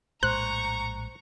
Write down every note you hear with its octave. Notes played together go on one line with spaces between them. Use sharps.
A#1 A2 G#3 C5 A#5 C#6 F#6